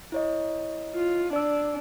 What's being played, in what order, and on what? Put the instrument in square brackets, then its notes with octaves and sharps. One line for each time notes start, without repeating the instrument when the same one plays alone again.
[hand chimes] E4 C#5 D#5
[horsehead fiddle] F4
[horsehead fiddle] D4 [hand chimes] D5 E6